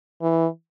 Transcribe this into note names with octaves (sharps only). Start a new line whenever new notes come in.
E3